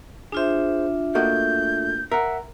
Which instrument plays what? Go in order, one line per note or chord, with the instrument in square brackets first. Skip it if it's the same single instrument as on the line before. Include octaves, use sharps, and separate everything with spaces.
[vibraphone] D4 F4 E5 [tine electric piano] G#4 C5
[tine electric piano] A3 [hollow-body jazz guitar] A#3 F#4 D#5 [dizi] G6
[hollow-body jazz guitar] A#4 [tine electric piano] E5 F#5